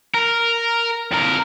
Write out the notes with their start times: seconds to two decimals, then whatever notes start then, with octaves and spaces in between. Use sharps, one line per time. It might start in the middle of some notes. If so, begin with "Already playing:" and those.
0.14 A#4
1.12 F2 A#4